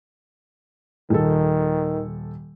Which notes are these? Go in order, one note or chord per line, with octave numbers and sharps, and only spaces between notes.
D#1 D#3 A4